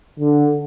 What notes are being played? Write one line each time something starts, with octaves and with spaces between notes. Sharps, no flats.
D3